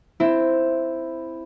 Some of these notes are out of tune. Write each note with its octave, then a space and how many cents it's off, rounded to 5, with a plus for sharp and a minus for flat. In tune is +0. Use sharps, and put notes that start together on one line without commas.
C4 +0 E4 +5